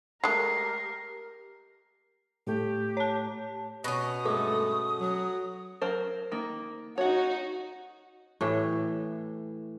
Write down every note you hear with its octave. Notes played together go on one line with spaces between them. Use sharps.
G#3 A3 G4 A#4 C7
A2 A3 G4
C#5 A5
B2 C#4 D#6
G2 G#3 A3 A4
F#3
F#3 A#4 C5
D#3 A#3
D#4 F#4 C#5 F#5
A2 E3 G4